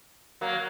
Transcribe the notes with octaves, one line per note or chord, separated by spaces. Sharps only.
F#3 A#3